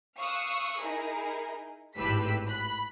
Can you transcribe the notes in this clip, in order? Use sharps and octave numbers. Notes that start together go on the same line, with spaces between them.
F5 C#6 D#6 E6 F#6
D#4 E4 G#4 A#4
G#1 A2 G4 B4 E6 B6
B5 F#6